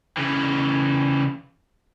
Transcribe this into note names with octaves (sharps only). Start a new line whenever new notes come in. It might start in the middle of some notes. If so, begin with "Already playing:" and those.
C#3 E3